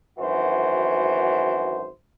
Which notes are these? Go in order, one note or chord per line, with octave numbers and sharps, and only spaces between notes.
G#1 F#2 E3 F#4 C5